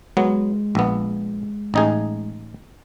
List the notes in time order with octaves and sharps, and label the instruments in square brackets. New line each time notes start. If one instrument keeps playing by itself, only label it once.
[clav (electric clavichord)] F#3 B3 [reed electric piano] G#3
[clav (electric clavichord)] A#1 B3
A1 D#4 G#4